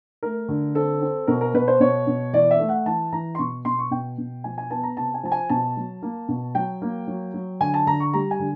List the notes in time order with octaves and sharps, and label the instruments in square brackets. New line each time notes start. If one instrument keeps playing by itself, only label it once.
[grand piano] A3 A#4
D3
C4 A4
C4
B2 A#4
A#4
B2 B4
C5
B2 C#5
B2
E3 D5
E5
A3
F#5
E3 A5
E3 A#5
C6
B2 C#6
B2 C6
C#6
B2 G5
B2
F3 G#5
G#5
B3 A5
A#5
C3 A5
G#5
F3 A5
G#5
B2 A5
F#3
A#3
B2
F#3 G5
A#3
F#3
F#3
D3 G#5
A5
D3 A#5
C#6
G3 A#5
G#5
D3